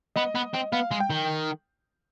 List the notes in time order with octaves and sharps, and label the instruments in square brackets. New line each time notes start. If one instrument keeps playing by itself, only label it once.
[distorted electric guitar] B3 [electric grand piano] D#5
[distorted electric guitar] B3
C4
[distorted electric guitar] B3 [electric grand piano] F5
[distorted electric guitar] G#3
[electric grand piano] G5
[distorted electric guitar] D#3